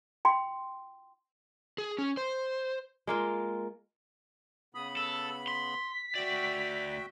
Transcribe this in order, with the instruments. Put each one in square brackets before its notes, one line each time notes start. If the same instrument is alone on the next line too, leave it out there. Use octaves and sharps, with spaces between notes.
[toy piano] G5 C6
[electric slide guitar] G#4
C#4
C5
[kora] G#3 A#3 F4
[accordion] C#3 B3 B5 [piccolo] D#6
[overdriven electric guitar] A4 [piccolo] E6
[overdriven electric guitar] C6 [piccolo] B6
[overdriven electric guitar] D2 D5 [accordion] F#4 E5 G5